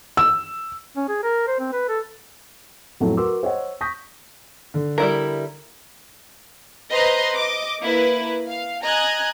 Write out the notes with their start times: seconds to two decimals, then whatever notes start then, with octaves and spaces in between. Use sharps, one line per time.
0.17 E6
0.96 C#4
1.09 G#4
1.23 A#4
1.47 C5
1.60 C4
1.73 B4
1.89 A4
3.00 F2 A2 F#3 A3
3.17 F#4 A#4 B4 C6 D6 E6
3.43 C5 C#5 D#5 F#5
3.81 C#6 D#6 G6 A#6 B6
4.74 D3
4.98 G3 E4 A#4
6.91 B4 C5 D#5 A#5 C6
7.35 D#5 D6
7.82 A#3 E4 B4
8.49 F5
8.83 D#5 G#5 A#5 F#6 G#6